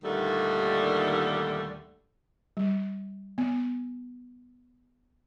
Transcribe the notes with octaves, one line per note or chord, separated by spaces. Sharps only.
D#2 A#2 D3 D#3 G3 A3
G3
B3